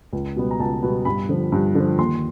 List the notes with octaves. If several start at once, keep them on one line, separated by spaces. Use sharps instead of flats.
C#2
B2 G3 B3
A#5
C#2 A5
B2 G3 B3
G2 B5
D3 F3
G2
D3 F3
D#2 C6